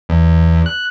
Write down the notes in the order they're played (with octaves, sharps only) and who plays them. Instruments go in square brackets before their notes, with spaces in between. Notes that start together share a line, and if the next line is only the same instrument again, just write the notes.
[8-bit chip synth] E2
F#6